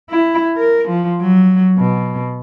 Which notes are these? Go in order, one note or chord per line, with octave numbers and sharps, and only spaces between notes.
E4
A#4
F3
F#3
B2